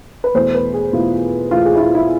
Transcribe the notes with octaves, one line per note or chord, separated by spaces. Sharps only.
B4
E2 B2 A3 E4 C5
B4
G#4
E2 B2 A3 E4 F4
E2 B2 A3 E4 F4
G#4
E4
F4
E4